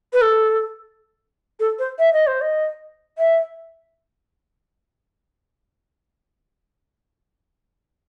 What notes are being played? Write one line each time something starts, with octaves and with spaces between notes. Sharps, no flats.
B4
A4
A4
C5
E5
D#5
C5
D#5
E5